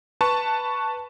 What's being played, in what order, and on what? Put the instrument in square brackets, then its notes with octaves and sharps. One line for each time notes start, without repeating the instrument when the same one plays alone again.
[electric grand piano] B4 A5 C#6